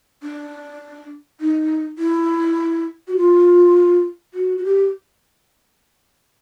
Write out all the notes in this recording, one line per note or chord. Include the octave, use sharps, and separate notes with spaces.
D4
D#4
E4
F#4
F4
F#4
F#4
G4